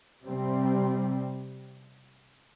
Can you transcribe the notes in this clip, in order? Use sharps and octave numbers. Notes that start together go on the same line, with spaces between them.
C3 G3 C4